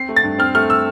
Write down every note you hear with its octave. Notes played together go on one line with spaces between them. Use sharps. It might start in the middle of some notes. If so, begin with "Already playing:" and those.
Already playing: C4 C7
A3
A6
G2
C4 F6
A3 F6
E6